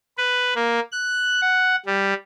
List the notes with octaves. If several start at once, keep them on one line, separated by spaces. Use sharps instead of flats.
B4
A#3
F#6
F#5
G3